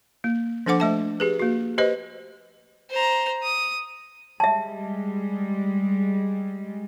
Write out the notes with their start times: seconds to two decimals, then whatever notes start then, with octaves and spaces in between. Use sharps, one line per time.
0.24 A#3
0.66 F3 D4 A4 C5 F#5 D6
0.80 A3 E5 A5
1.20 G4 G#4 B4
1.39 A#3 F#4
1.78 G4 B4 C5 D#5
2.91 C5 A#5
3.43 D#6
4.40 G3 G#3 E5 A5